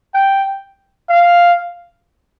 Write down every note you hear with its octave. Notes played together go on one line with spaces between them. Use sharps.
G5
F5